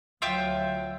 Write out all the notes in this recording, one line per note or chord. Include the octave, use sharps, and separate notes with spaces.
D2 F#3 F4 E5 G5